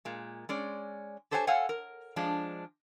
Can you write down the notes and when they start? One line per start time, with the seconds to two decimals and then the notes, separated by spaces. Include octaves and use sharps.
0.05 A#2 G#3
0.49 G#3 C#4 D5
1.31 G4 A4 C5 C#5 F5 G#5
1.47 A4 C#5 F5 F#5 G#5
1.69 A#4
2.16 F3 G#3 D4